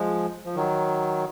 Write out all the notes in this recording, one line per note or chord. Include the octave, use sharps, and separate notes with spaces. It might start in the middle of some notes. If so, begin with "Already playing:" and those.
Already playing: F3 G#3
F3
D#3 F#3